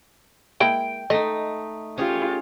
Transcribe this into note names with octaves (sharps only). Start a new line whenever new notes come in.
G#3 A#3 E4 G5
A3 D#4 D#5
C#4 F4 G4 G#4 C#5